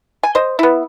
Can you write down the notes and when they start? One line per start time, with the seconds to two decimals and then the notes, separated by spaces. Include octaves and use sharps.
0.23 G#5
0.35 C5 D#5
0.59 B3 E4